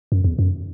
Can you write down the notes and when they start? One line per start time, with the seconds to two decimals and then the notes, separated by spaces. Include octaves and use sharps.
0.12 F#2
0.24 E2
0.39 F#2